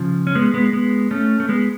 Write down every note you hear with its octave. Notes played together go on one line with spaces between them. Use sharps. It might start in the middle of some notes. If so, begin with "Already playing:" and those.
Already playing: C#3 F3
C#4
G#3 B3
G#3 B3
G#3 B3
A3 C#4
A3
G#3 B3